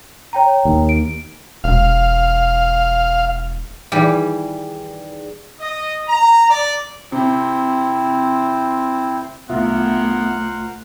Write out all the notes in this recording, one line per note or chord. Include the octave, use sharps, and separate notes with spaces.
C#5 G5 A#5
D#2
D7
E1 F5
D#3 E3 G3 G4 G#4 D5
D#5
A#5
D5
C3 C4 E4 C5
C2 A3 B3 F4 A#4 C5 E5 F#5